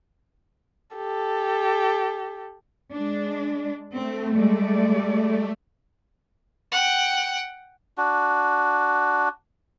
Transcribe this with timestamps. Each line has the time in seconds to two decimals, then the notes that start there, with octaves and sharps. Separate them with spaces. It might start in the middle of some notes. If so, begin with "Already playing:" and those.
0.96 G4 A4
2.92 G#3 D4
3.95 A3 C4
4.36 G3 G#3 D5
6.72 F#5 G5
7.98 D4 F#4